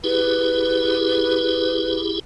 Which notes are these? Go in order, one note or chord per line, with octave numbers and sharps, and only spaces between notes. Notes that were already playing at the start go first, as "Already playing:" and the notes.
E4 G4 G#4 B4